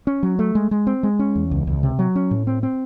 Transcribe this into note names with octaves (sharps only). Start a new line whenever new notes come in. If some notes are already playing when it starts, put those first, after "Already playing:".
C#4
F#3
A3
G#3
G#3
C4
G#3
C#4
E2
C#2
C#2
C3
F#3
C#4
A2
C4
C4